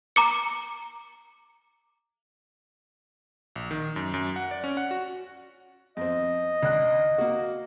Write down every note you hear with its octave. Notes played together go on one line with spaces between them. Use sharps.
A#5 D6 C#7
A#1
D#3
F#2
F#2
F#5
D5
C#4
F#5
F#4
F2 C4 D#5
C#2 D4 F#6
A#3 F#4